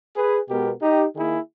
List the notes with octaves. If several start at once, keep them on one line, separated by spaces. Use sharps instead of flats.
G#4 B4
B2 G#3 B3 G4 A#4
D#4 G4
D#3 A#3 E4 G#4